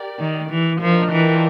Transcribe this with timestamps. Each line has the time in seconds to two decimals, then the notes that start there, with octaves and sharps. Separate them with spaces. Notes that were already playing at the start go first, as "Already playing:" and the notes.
Already playing: G4 A#4 D5
0.19 D#3
0.50 E3
0.81 F3 D4 F4 A#4 D#5 G5
1.12 E3